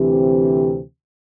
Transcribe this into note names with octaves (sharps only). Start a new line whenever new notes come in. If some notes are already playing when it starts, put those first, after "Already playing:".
Already playing: D2 C3 E3 C4 G4